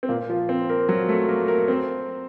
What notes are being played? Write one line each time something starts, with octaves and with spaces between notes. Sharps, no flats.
C4
A#2 A#3
F3 F4
C4 C5
A#3 A#4
F#3 F#4
A3 A4
A#3 A#4
A#3 A#4
C4 C5